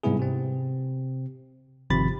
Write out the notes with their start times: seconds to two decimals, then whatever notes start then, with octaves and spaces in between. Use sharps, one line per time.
0.03 G#2 C3 G3 B3 E4 G#4
0.19 C3 C4
1.90 G1 C3 D#3 F3 B5 A6